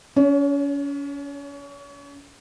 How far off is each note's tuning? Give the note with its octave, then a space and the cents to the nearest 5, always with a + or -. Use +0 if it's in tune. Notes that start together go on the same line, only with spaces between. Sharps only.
C#4 +35 C#5 +0